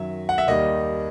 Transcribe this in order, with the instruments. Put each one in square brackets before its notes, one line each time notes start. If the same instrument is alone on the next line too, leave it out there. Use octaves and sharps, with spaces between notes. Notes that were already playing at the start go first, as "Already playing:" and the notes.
Already playing: [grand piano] F#2 D#3 F#3 E5
F#5
E5
D#2 D#3 G3 D#5